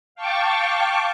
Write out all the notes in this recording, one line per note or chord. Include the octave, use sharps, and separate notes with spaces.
F5 G5 A5 C#6 D6